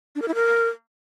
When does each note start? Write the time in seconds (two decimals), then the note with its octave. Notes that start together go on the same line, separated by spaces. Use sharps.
0.16 D4
0.22 A#4
0.28 E4
0.35 A#4